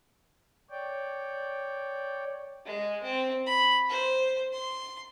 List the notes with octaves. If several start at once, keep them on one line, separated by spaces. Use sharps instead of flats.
C#5 D5 G5
G#3
C4
B5
C5
C6